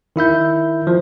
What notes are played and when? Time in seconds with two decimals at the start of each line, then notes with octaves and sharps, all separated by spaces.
0.16 D#3 E4 E5 G6
0.87 F3